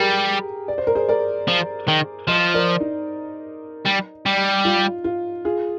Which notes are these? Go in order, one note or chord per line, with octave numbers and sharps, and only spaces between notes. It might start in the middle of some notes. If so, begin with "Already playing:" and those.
Already playing: G3 G4 G#4 A#4
D5
C5
A#4
G#4 C5
A#4 D5
F3
D#3
F3 C5 D#5
A#4 D5
D#4
G3
G3
F4
F4
F4 G#4